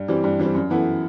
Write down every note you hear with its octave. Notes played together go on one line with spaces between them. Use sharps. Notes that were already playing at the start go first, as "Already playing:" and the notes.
Already playing: G2
E3 G3 C4
G2
E3 G3 C4
F#2
E3 B3 E4 A4